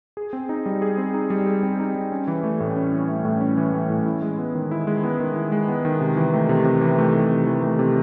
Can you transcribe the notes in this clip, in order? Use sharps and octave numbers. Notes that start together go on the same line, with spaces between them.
G#4
C4
D#4
G3
G#4
C4
D#4
G3
G#4
C4
D#4
G3
C#4
E3
A3
A2
C#4
E3
A3
A2
C#4
E3
A3
A2
E4
G#3
B3
D#3
E4
G#3
B3
D#3
E4
G#3
B3
D#3
C3
E3
A3
C3
C3
E3
A3
C3
C3
E3
A3
C3